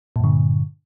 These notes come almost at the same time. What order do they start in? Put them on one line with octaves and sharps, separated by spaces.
A#2 G2 D3